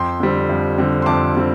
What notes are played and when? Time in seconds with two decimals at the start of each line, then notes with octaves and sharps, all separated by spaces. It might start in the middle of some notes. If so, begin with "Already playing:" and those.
Already playing: F2 G5 C6
0.20 D3 G3 C4
0.50 F2
0.78 D3 G3 C4
1.02 C6
1.06 F2 A5 D6
1.35 D3 G3 C4